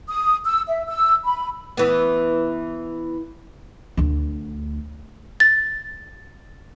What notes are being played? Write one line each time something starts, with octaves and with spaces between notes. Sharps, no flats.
D#6
E6
E5
E6
B5
E3 B3
D2 D3
A6